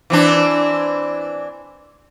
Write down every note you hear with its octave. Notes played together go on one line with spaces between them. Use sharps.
E3 C4 D4